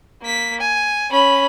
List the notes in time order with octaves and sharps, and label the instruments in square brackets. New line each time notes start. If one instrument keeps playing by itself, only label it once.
[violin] A#3 B6
G#5
C#4 B5